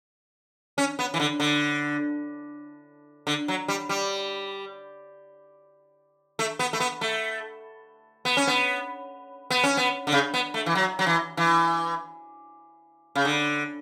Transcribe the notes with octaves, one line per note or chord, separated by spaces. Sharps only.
C#4
B3
E3
D3
D3
D3
F#3
G3
G3
A3
B3
A3
B3
A3
B3
C#4
B3
B3
C#4
B3
D3
C#3
B3
A3
E3
F#3
F#3
E3
E3
C#3
D3